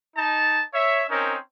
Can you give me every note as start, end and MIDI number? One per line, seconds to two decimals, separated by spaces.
0.16 0.61 63
0.16 0.61 81
0.73 1.03 73
0.73 1.03 76
1.10 1.36 60
1.10 1.36 61
1.10 1.36 63
1.10 1.36 70